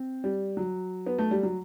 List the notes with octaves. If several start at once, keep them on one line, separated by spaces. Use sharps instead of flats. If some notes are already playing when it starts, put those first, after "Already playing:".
Already playing: C4
G3
F#3
B3
A3
G3
F#3